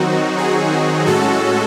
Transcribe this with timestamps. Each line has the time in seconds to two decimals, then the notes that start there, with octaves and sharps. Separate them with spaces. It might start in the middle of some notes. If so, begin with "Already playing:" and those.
Already playing: D#3 F#3 C4 D#4 F#4
0.38 G#4
1.06 A2 G#3 C#4 F#4 A4